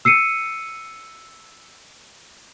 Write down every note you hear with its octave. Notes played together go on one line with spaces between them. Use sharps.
E6 C7 C#7 D#7